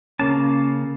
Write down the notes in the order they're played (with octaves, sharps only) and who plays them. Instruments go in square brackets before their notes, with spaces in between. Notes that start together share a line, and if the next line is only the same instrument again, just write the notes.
[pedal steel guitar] C#3 A#3 A5 [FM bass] C#4